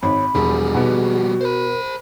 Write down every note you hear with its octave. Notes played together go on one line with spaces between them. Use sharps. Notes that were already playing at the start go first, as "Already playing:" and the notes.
G#1 C#5 B5
E1 F3 G3 G#4
B2 B3 F#4
A#4 C5 B5